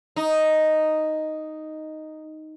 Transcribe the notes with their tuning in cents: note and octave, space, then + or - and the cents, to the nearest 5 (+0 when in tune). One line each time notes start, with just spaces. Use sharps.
D#4 +0